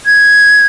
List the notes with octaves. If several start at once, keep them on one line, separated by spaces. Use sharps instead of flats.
G#6